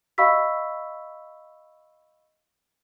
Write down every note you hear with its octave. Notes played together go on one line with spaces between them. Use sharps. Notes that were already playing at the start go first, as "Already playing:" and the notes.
D#5 F5 B5 C#6 E6 B6